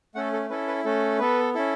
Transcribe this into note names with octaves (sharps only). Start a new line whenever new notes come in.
A3 C#4 A4 F#5
A4
C#4 E4 A4 B4
B4
A3 C#4 A4
B3 A4 B4
C#4 E4 A4